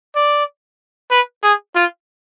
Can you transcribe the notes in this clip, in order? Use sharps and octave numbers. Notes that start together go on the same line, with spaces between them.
D5
B4
G#4
F4